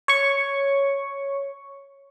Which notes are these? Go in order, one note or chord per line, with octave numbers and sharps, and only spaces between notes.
C#5 C#6